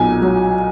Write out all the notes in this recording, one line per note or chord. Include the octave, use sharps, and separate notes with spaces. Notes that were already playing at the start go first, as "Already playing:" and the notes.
Already playing: B1 A#2 G#5
F#3